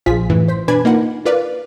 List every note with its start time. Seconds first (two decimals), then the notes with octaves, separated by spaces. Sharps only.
0.06 A#1 F3 F4 G#4 B6
0.29 F#2 A2 E3
0.48 C5 B6
0.68 B2 D4 B4 G#5 B5 G#6
0.85 A#3 D#4 F4 F#5
1.25 F4 A#4 B4 D5 F5